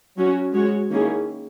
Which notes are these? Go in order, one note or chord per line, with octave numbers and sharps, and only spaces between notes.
F#3 C#4 F#4
G#3 C#4 F#4 C#5
D#3 A#3 C#4 E4 G#4